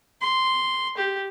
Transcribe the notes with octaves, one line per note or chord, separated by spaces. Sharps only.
C6
G4